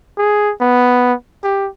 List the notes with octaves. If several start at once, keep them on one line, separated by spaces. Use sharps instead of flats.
G#4
B3
G4